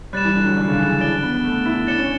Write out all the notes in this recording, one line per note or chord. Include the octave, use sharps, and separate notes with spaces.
G3 F#6 A6 E7
E3
D3
F#3
D3
C#3
E3
D4 A6 D7 G7
B3
A3
E4
D4 A6 C#7 E7 G7
C#4